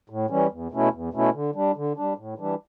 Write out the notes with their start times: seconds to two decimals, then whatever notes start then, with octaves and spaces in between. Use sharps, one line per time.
0.10 A2
0.30 E3 G3 C#4
0.51 E2
0.72 B2 A3 C#4 E4
0.93 E2
1.13 B2 A3 C#4 E4
1.34 D3
1.55 G3 D4
1.76 D3
1.97 G3 D4
2.17 A2
2.38 E3 G3 D4